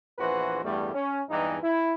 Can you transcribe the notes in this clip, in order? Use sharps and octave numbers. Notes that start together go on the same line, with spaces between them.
A#1 E2 E3 F#4 B4 C5
E2 G2 G3 A3
C#4
E2 G2 E3 G#3 D#4
E4